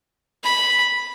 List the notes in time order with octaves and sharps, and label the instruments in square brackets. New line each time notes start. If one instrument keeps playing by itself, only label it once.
[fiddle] B5